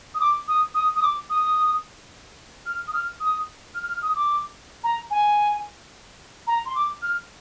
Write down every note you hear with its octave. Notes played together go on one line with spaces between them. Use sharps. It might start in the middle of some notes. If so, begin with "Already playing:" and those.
D#6
D6
D#6
D#6
D#6
D6
D#6
F6
D#6
F6
D#6
F6
F6
D#6
D6
A#5
G#5
A#5
C6
D6
F6